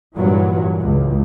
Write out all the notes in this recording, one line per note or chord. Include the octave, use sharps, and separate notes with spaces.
G2 A#2 E3 F#3
C#2